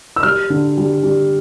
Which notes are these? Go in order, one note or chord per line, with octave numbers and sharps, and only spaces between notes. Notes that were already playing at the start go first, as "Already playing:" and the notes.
E6
G3 F6
D3
G3
G3